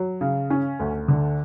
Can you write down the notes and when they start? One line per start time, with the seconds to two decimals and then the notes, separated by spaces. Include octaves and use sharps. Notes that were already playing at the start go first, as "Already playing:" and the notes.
Already playing: F#3
0.21 C#3
0.50 C#4
0.80 D2
1.08 D3